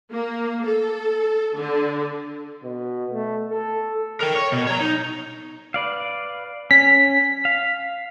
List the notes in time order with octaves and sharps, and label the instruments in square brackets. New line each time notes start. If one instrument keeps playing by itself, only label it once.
[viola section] A#3
A4
D3
[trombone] B2
A3
A4
[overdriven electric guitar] A#4 G5
C#5
B2
C#5 A#5
D#4
[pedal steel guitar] B4 D5 F5
[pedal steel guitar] C#4 [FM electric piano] B6
[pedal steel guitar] F5